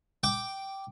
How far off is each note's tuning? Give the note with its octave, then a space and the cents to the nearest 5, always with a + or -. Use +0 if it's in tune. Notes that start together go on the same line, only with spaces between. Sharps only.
G5 -10 D6 +0